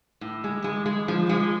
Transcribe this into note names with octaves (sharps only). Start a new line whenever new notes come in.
A2
G#3
G#3
G#3
F3
G#3